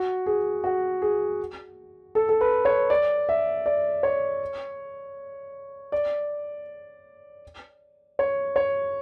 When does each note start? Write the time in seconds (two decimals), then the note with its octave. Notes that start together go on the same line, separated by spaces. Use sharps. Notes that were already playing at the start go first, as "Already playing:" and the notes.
Already playing: F#4
0.26 G#4
0.64 F#4
1.02 G#4
2.15 A4
2.29 A4
2.41 B4
2.65 C#5
2.90 D5
3.29 E5
3.66 D5
4.03 C#5
5.92 D5
8.19 C#5
8.56 C#5